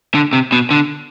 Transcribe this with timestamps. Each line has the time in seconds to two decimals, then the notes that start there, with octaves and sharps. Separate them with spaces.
0.15 D3
0.33 C3
0.52 B2
0.71 D3